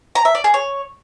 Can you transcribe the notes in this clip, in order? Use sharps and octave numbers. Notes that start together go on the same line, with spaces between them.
A#5
E5
D5
G#4
C#5